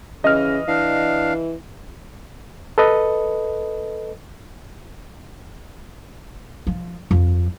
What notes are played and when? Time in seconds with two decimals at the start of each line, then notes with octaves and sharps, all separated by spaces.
0.24 C#3 E3 D#5 F6
0.68 E3 D4 F5
2.78 A4 B4 D#5
6.67 F3
7.11 F2